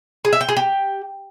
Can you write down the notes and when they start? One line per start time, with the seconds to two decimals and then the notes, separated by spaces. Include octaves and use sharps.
0.25 G#4
0.33 E5
0.41 G5
0.49 G#4
0.57 G4